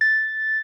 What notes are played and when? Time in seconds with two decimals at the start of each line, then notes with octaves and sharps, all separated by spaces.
0.01 A6